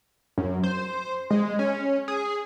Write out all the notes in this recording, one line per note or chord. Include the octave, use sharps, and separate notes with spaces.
F#2
C5
G#3
C#4
G#4